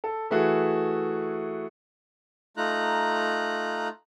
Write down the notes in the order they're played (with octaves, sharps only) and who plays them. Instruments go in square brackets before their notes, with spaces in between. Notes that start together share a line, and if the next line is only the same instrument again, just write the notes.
[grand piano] A4
E3 A3 E4 F#4 G#4
[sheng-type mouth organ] A3 D#4 F4 A#5 F#6